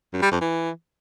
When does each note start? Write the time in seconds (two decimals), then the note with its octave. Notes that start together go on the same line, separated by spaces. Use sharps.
0.13 F#2
0.22 G3
0.31 F2
0.41 E3